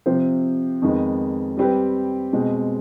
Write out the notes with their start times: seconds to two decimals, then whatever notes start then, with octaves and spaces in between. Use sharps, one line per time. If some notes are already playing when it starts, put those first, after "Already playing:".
0.06 C3 F3 C4 G4 C5
0.82 F2 D#3 G#3 B3
1.57 G3 C4 G4 B4
2.33 B2 G#3 C4